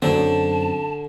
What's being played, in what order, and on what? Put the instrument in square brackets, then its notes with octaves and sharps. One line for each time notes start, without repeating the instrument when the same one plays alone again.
[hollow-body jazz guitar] F#2 F#3 C4 [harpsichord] D3 [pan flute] A5